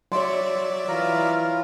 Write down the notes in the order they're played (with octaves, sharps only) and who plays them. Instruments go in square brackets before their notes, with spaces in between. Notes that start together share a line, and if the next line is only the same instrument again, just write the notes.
[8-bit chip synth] F#3 D5 E5 [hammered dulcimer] C#5 C6
[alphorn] E3 [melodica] F4 A#4